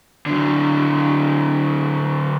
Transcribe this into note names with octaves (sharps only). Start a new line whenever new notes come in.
D3 F#3